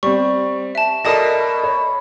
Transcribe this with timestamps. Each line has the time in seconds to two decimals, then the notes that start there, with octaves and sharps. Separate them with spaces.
0.03 G3 C4 C#6
0.75 E5 A5
1.05 B2 A4 A#4 D5 D#5 A5 D#6
1.64 C#5